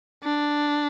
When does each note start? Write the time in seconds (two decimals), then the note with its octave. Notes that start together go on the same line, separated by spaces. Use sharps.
0.24 D4